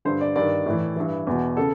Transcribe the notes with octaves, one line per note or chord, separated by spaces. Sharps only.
G2 D3 C5
D5
G2 D#3 D5
A2 E3
G2 E3
E2 B2
C#3 A4